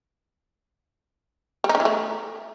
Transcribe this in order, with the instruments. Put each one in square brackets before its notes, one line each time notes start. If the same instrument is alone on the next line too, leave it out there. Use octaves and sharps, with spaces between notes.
[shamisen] G3
D#4
D3
E3
A3